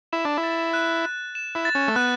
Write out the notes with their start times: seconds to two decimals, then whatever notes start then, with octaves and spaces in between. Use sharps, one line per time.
0.12 E4 E7
0.25 D4
0.38 E4
0.43 A6
0.73 F#6
1.05 F#6
1.35 E7
1.55 E4
1.65 A6
1.75 C#4
1.88 A3
1.96 B3 F#6